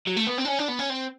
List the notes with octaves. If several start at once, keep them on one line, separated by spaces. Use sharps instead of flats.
F#3
A3
B3
C4
D4
C#4
D4
B3
C#4
C4